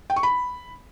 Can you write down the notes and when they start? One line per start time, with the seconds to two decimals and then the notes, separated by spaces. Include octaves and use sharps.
0.10 G5
0.16 C#6
0.23 B5